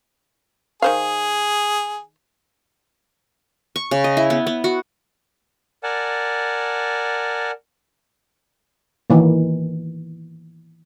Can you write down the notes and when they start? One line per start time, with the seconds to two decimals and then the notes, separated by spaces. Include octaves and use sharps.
0.82 D#3 G#4 C5 F5
3.76 C#6
3.91 C#3
4.04 D#5
4.17 E4
4.30 B3
4.47 B3
4.64 F#4
5.83 A#4 D5 F#5 G#5 A5
9.10 D#3 E3 A#3